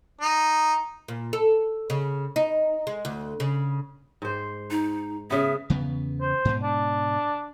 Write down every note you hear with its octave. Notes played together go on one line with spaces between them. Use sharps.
D#4
A#2
A4
C#3
D#4
G#3
D2
C#3
G#2 C5
D#4
C#3 B3 E5
E2 C#3 B3
C5
G#2 B2
D4